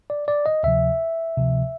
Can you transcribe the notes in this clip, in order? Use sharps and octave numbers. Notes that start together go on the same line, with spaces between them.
D5
D5
D#5
D2 C3 F3 E5
D2 C3 F3